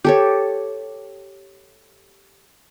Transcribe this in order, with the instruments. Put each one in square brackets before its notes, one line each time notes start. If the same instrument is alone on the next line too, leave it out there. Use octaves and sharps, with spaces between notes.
[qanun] G4 A4 C#5